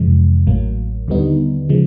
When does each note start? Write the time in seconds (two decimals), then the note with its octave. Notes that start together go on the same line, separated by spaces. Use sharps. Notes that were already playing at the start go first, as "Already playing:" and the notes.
Already playing: F2 C3 E3 G#3
0.47 A1 A2 F#3 A#3
1.08 D#2 D3 G3 B3 D#4
1.69 C#3 F3 G#3